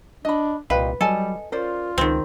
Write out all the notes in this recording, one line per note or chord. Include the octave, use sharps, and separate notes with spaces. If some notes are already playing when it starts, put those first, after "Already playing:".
D4 D#5 B5
C2 A#2 B4 D#5 F5 G5
F#3 G3 A4 D#5 G#5 A5
C#4 F4 A#4 C5 D5
C#2 D#3 C4